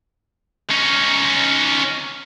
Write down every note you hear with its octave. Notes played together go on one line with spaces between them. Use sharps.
C#4 D#4